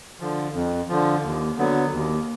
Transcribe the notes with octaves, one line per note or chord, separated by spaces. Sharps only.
D3 F3
F2
D3 F3
D#2
D3 F#3 B3
D#2